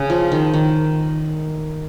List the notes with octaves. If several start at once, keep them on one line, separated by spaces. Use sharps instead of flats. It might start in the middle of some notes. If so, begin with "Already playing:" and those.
Already playing: C#3
F3
D#3
D#3